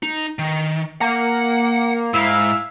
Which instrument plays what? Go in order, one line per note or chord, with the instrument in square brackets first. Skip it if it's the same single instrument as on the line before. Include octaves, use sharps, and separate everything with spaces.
[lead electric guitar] D#4
D#3
[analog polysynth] A#3 [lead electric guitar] F#5
[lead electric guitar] G#2 [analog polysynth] E4 E5 F5